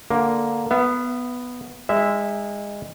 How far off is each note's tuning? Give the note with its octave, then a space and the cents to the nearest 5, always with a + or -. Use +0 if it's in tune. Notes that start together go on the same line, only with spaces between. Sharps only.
D3 +0 A#3 +0
B3 +0 E5 +45
G#3 -25 D#4 +0 E5 -5